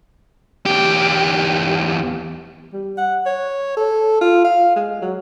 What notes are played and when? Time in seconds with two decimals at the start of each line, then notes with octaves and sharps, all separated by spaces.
0.66 E2 G4
2.73 G3
2.98 F#5
3.26 C#5
3.77 A4
4.21 F4
4.44 F5
4.76 G#3
5.02 F#3